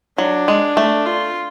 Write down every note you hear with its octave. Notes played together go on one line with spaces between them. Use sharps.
F#3 D4
G#3
A3
F4